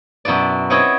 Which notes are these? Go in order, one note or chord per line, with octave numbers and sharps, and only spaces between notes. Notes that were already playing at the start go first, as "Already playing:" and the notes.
F#2 B2 E4 B4 D5
B3 C4 E4 C#5 D#5 G5